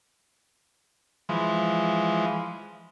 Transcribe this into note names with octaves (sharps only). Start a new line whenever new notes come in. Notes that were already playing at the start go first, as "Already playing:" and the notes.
E3 F3 G#3